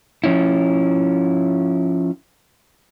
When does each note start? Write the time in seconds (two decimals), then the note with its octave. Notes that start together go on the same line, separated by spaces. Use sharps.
0.24 F3 C#4 E4